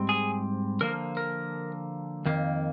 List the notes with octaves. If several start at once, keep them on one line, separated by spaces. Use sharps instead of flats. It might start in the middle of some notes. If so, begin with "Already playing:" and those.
Already playing: G#2 G3 C4
G#4
D3 F3 A#3 A#4
A#4
F2 D#3 A#3